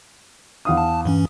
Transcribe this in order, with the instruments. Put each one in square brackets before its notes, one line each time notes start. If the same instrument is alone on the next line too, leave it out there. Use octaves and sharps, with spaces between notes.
[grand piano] E2 F5 D#6
[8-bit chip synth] A5
G2 E3 C#4